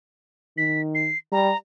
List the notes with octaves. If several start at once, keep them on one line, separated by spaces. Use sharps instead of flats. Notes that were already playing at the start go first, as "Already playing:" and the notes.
D#3 B6
C7
G3 A#5